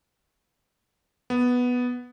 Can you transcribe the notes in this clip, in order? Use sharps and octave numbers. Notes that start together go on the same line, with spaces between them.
B3